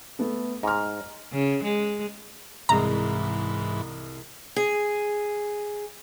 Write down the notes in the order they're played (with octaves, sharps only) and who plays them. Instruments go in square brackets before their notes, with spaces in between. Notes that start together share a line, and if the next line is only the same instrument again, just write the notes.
[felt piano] A3 B3 A4
[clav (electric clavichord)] G#2 [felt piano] A#5 F6
[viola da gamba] C#3
G#3
[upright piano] C2 G#3 [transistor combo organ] G#2 E3 [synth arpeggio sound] A#5
[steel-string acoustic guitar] G#4